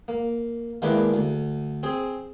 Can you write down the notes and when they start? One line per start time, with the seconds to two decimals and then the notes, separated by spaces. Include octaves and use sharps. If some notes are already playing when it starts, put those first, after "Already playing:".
0.08 A#3
0.82 D#3 G#3 A#3 D4 E4 B4
1.14 D2
1.83 C4 G#4